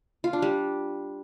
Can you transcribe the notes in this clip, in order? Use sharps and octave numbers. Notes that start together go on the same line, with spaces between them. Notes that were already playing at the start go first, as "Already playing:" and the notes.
F4
D4
G3